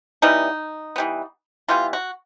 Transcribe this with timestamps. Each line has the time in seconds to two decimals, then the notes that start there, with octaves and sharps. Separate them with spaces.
0.22 E3 G3 B3 D#4
0.96 E3 G3 B3
1.68 E3 G3 B3 F4
1.93 F#4